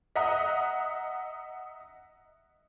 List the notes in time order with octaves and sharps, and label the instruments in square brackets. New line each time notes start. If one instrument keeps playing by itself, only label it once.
[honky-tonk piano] D#5 E5 F#5 A#5 D#6